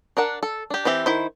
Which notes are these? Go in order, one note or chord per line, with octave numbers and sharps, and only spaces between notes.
D4 A#4 F#5 A5
A4
D4 G4
E3 C4 G4 E5
D#3 E4 C5